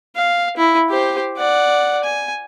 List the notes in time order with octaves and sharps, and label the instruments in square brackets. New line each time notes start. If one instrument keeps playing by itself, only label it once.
[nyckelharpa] F5
E4
G4 C5
D5 F#5
G#5